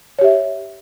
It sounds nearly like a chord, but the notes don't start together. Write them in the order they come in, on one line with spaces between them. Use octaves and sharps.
C#5 G4 E5